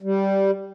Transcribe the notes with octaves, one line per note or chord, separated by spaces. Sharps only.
G3